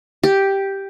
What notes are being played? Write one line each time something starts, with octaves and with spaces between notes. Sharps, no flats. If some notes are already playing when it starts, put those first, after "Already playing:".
G4